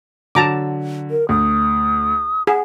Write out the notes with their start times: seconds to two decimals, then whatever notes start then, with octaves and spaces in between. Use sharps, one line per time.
0.35 D3 F#3 A5 A#5 D6
1.11 A#4
1.29 D2 D#6
2.47 G#4 F#5